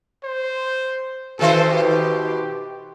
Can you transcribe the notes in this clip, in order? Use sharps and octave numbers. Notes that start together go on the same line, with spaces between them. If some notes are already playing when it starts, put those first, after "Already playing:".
C5
B2 D#3 A4 C5
G4